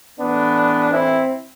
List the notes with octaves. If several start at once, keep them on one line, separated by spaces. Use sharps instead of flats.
A2 E3 B3 D4
C4 E4